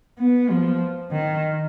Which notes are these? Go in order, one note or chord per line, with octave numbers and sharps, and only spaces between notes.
B3
F3
D#3